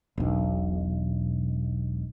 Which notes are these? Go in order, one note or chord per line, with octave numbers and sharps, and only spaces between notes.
E1 B1